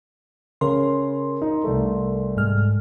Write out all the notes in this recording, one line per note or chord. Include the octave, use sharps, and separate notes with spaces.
C#3 A#4 C6
D#4
C2 A3
G#2 G#3 F6